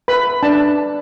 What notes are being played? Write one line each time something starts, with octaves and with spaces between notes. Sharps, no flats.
B4 B5
D4 A5